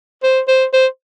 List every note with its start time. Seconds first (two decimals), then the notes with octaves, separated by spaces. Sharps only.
0.23 C5
0.48 C5
0.73 C5